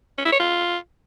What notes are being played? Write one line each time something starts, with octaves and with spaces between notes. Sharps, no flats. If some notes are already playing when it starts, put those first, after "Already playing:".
C#4
E4
C#5
F4